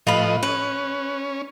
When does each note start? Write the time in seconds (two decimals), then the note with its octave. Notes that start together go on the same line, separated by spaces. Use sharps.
0.07 A2 F3 F4 B4 D#5 B5
0.43 C#4 B4